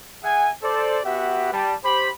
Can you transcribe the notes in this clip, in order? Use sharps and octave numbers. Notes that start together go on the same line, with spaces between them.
G#4 E5 F#5 G#5
A4 C5 D5
B3 F#4 G4 B4 E5 F#5
G3 A5
G4 C5 B5